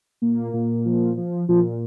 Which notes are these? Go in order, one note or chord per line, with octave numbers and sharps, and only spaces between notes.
A#2 A#3
A#2
F3
F3
A#2 F3 F4